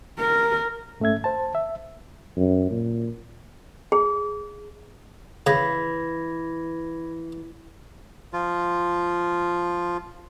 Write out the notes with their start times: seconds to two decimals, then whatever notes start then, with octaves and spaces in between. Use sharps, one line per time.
0.19 A#4
1.00 G#2 A3 C#4 E5 G#6
1.24 C5 A5
1.55 E5
2.36 F#2
2.71 A#2
3.92 G#4
5.47 C#3 E3 B5 G#6 A#6
8.33 F3 F4